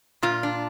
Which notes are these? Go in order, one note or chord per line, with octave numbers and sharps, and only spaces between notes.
A#2 F4
D4